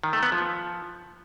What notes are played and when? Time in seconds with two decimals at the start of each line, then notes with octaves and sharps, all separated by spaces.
0.03 D#3
0.13 A3
0.23 B3
0.32 F3